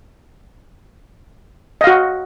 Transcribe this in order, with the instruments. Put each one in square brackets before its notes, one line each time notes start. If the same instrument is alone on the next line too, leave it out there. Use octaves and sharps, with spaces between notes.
[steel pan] D#5
F5
F#4